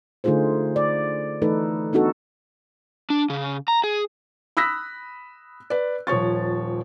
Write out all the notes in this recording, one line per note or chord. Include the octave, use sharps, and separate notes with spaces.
D3 A3 D#4 F4 G#4 C5
D5
E3 A3 D#4 A4 B4
B3 D4 D#4 F#4 A4
D4
C#3
A#5
G#4
B5 D#6 E6 F#6 A#6 B6
B4 D5
D#1 F3 C#5 C#6 A6